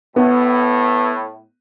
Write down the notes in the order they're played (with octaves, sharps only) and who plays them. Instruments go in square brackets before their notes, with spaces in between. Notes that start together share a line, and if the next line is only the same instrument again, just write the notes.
[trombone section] A2 [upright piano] B3